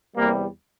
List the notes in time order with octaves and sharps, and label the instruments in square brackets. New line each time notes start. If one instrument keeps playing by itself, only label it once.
[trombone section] E2 C3 G3 A#3